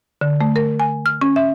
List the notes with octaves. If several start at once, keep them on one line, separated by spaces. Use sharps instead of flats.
D3
A3
A#4
G#5
F6
C#4
E5